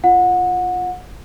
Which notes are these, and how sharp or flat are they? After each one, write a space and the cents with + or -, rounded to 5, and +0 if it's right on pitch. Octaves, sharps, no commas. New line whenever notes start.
F4 -15 F#5 -30